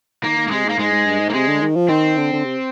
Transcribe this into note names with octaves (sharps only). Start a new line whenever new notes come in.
D#3 A#3
D#3
A#3
C3 G#3
G#2
A#3
G#2 G#3
G#2
G2
G#2
A#3
C3 G#3
D3
D#3
F3
D#3 C4
D3
D3
C3